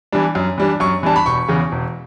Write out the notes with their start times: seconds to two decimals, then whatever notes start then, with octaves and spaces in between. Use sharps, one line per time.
0.12 E3 G3 D4
0.35 F#2
0.58 E3 G3 D4
0.80 F#2 C#6
1.03 E3 G3 D4 A5
1.16 B5
1.26 E1 C#6
1.48 E2 C#3
1.72 E1